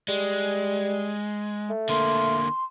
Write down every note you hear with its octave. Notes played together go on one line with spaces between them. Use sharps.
G3 G#3
A3
D3 A#3 C6